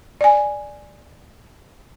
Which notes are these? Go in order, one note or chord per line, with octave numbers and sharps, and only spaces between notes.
D5 G#5